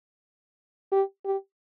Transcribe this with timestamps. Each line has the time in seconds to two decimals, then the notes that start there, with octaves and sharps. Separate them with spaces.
0.92 G4
1.25 G4